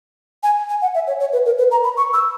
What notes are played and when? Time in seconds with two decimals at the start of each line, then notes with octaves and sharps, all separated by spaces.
0.43 G#5
0.69 G#5
0.82 F#5
0.95 E5
1.07 C#5
1.20 C#5
1.33 B4
1.46 A#4
1.58 B4
1.71 A#5
1.84 B5
1.97 C#6
2.14 E6